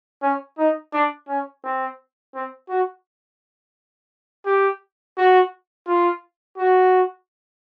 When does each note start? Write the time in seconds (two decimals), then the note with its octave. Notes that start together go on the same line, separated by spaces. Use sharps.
0.23 C#4
0.58 D#4
0.93 D4
1.28 C#4
1.64 C4
2.34 C4
2.69 F#4
4.46 G4
5.17 F#4
5.88 F4
6.58 F#4